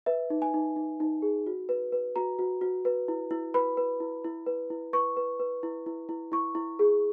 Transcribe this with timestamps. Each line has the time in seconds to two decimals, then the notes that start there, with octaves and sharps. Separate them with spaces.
0.06 B4 E5
0.30 D#4
0.42 G#5
0.54 D#4
0.76 D#4
1.00 D#4
1.22 G#4
1.47 F#4
1.69 B4
1.92 B4
2.16 F#4 A#5
2.39 F#4
2.61 F#4
2.85 B4
3.08 E4
3.31 E4
3.54 B4 B5
3.77 B4
4.00 E4
4.24 E4
4.46 B4
4.70 E4
4.93 B4 C#6
5.17 B4
5.40 B4
5.63 E4
5.86 E4
6.09 E4
6.32 E4 C#6
6.55 E4
6.79 G#4